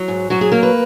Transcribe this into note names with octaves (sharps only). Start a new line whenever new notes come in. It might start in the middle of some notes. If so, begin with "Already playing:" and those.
Already playing: F#3
G#2
F#3 F#4
G#4
A#3 A#4
B4